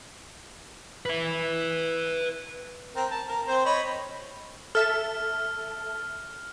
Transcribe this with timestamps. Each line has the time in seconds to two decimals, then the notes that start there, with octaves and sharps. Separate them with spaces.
1.06 B4 E5
2.96 C4 A#4
3.11 A5
3.28 A#4
3.47 C4 C5
3.65 C#5 D#5 B5
4.75 A4 E5 A5 F6